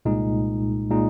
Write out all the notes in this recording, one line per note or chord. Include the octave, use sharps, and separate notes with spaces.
C2 A#2 G#3 D#4
A#2 G#3 D#4